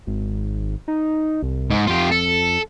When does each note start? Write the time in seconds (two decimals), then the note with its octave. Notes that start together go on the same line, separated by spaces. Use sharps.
0.07 G#1
0.88 D#4
1.43 C2
1.70 G#2
1.87 F2 F4 G4
2.12 A4